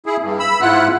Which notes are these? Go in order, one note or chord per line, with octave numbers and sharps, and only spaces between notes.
E4 G#4
G2
B5 E6
G#2 E4 F4 F#5 F#6